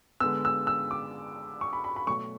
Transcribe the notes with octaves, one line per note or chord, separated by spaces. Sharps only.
D3 G#3 B3 E6
E6
E6
D6
C#6
B5
B5
B5
B2 F#3 A3 C#6